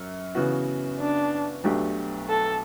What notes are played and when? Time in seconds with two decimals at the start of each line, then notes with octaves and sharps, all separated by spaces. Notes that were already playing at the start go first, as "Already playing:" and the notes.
Already playing: F#2
0.35 C#3 E3 B3 F#4
0.99 D4
1.64 B1 B2 A3 D4 G4
2.29 A4